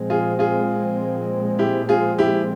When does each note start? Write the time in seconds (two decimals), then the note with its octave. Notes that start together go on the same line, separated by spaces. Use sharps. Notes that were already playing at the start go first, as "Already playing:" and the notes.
Already playing: A#2 F3 G#3 C4
0.10 F4 G#4
0.39 F4 G#4
1.59 E4 G4
1.89 F4 G#4
2.19 E4 G4